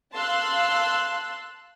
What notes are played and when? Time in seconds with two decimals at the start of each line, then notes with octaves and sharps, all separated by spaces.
0.14 F5 A5 C6 E6 F#6